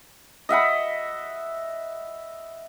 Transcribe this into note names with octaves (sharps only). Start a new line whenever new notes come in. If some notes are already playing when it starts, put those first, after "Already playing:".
D#5 E5 F#5 B5